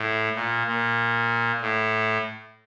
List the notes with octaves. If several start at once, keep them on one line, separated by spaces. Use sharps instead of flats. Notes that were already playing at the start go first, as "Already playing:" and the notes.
Already playing: A2
A#2
A#2
A2